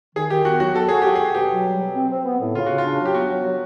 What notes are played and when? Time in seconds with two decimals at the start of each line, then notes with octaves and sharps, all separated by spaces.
0.16 D#3 G#4
0.30 D#3 G4
0.45 B3 F#4
0.60 F#3 F#4
0.75 F#4 A4
0.88 F#4 G#4
1.02 F#4 G4
1.15 G#4
1.20 F#4
1.35 B2 G4
1.50 F#3
1.65 G3
1.80 B2
1.95 C4
2.10 C4
2.25 B3
2.40 A2
2.55 C#3 F4
2.66 C#3 F#4
2.78 F4
2.84 D4
3.00 F#3
3.05 G4
3.14 B3 F#4
3.30 F#3
3.45 F#3